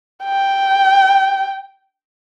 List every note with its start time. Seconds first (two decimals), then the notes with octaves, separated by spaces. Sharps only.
0.24 G5